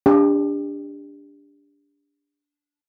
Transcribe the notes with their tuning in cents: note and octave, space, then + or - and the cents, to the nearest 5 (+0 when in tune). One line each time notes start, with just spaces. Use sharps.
D4 -15 G4 +35